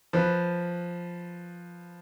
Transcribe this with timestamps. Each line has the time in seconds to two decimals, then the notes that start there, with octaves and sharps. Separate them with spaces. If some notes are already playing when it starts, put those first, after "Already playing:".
0.13 F3 B4